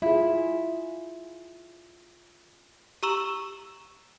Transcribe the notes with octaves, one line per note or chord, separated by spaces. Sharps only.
E4 F4 G#4
G4 A#5 C#6 E6 E7 F#7